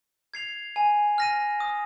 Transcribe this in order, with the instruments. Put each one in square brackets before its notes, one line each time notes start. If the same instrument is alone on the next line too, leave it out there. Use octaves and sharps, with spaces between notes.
[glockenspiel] G#6 C7 F7
G#5
F6 A#6 D#7
D#6